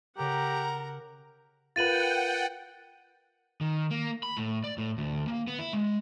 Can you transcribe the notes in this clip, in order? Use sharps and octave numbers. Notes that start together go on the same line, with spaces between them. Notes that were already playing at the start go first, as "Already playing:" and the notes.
C#3 G4 A4 A#4 F#5 A#5 F6
F4 A#4 B4 F#5 G5 A6 D#7 F#7
D#3
A#3
B5
A2
D5
A2
D2
A#3
B3
E4
G#3